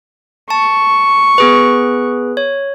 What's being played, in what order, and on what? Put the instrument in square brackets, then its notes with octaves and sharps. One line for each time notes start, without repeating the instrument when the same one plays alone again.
[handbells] A5 [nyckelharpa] C#6
[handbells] B3 G#4 B4
C#5